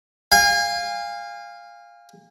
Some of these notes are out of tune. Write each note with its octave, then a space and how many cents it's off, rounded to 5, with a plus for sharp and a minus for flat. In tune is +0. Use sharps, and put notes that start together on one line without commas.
F5 +0 G#5 -35